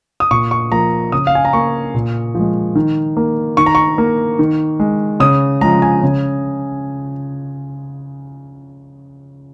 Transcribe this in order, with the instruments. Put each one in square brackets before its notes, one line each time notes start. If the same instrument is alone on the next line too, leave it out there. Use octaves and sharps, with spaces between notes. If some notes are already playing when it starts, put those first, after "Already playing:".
[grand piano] D#6
A#2 C#6
C#6
F3 A#3 A#5
C#3 D#6
F5
G#5
A#5
A#3 C#6
A#2
F3 G#3
D#3
A#3
D#3 C#6
A#5
C#6
A#3
D#3
G#3
C#3 D#6
F3 G#3 A#5
G#5
C#3